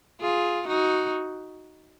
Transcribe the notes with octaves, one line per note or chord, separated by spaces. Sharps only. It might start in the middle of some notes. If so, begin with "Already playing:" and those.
F4 G#4
D#4 F#4